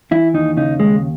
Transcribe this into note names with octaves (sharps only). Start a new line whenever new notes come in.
E3 E4
D#2 D#4
C#3 D#4
D#2 G#3